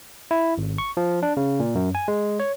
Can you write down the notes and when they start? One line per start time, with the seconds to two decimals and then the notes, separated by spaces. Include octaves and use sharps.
0.31 E4
0.58 G#1
0.78 C#6
0.97 F3
1.23 D4
1.37 C#3
1.60 A#2
1.75 F#2
1.95 G#5
2.08 G#3
2.40 C#5